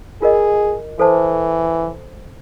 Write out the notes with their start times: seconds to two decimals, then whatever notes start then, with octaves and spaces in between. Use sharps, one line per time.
0.22 F4 G#4 A#4 D#5
0.99 E3 A4 C5 A5